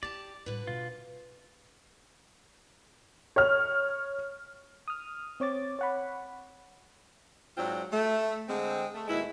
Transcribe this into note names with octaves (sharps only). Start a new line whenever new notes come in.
E4 G4 D5 A5
A2 D3 G3 B4
B2 F3 F4
C#5 F6
D#6 F6
C4 C#5 D6 A6
C#5 F#5 B5
G#2 F#3 C4 D4 F4
A3
D3 G#3 C4
A3
D#2 B2 G#3 E4